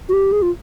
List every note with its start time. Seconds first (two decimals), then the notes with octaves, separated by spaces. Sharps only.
0.09 F#4
0.13 G4
0.32 G#4
0.42 F4